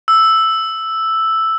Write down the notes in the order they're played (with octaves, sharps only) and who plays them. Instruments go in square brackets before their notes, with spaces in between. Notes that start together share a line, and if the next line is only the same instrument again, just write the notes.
[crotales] E6